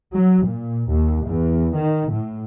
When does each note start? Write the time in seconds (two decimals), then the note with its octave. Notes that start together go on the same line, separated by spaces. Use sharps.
0.14 F#3
0.45 A#2
0.90 D#2
1.26 E2
1.74 D#3
2.12 A2